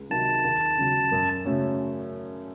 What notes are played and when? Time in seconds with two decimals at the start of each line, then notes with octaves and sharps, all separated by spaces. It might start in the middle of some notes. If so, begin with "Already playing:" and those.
Already playing: C#2
0.10 C3 D#3 F#3 A5
0.44 D#2
0.78 C#3 F#3
1.12 F#2
1.45 C#3 F#3 A3 C#4